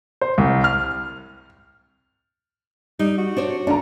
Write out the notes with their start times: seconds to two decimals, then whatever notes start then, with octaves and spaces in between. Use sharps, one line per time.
0.21 C5
0.38 C2
0.64 F6
2.99 G3 D#4
3.18 F#4
3.37 D4 C5 C#5
3.67 D3 D4 A#5